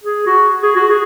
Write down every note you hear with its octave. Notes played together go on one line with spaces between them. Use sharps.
G#4
F#4
G#4
F#4
G#4